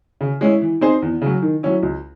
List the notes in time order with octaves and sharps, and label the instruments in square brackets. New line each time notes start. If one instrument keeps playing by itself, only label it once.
[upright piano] C#3
G#3 C#4 E4
E3
C4 D#4 G#4 C5
E2
C#3 F#3
D#3
F#3 C#4 E4
C#2